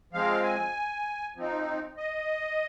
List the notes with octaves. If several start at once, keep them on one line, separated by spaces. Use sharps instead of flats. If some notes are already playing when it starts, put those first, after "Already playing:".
F3 G#3 C4 F5
G#5
F3 C4 D#4
D#5